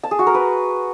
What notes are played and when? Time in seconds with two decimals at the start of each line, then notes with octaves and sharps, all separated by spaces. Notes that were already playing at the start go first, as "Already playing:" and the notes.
0.03 A5
0.11 G#4
0.19 F#4
0.27 A#4
0.34 B4